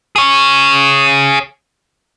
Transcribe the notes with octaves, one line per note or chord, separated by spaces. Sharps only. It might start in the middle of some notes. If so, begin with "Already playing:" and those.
G#4 C#5